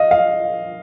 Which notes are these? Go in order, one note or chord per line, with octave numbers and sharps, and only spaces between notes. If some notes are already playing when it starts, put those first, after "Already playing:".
Already playing: D#5 F5
F5